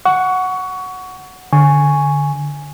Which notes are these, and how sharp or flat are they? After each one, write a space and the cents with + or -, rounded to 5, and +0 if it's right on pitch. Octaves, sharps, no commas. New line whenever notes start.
F#5 +0 C#6 +20
D3 +0 G#5 +0 C#6 +0